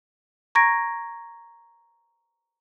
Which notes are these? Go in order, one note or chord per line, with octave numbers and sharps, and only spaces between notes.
A#5 C#6 G#6 A#6 D7